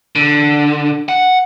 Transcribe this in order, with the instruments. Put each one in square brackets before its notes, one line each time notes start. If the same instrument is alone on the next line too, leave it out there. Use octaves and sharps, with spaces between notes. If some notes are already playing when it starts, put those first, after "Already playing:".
[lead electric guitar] D3
F#5